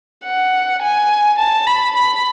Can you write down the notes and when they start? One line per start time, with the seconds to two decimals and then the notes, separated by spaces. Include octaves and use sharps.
0.25 F#5
0.82 G#5
1.39 A5
1.67 B5
1.96 B5